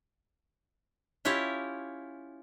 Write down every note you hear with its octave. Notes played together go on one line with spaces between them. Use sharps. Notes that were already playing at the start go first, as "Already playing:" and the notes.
C#4 E4 F4 G4 C#5